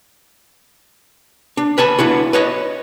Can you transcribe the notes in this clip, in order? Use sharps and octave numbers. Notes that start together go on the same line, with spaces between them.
D4
B4 G#5 A5
B3 D4 E4 F#4
B4 C#5 D#5